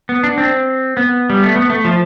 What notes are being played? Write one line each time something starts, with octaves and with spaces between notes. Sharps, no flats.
B3
D4
C4
B3
G3
A3
B3
A3
F3